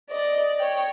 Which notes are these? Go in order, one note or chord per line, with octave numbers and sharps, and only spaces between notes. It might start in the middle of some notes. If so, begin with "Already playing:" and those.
D5 D#5
C#5 G5